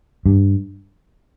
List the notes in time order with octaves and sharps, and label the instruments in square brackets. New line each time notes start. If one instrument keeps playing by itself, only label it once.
[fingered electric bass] G2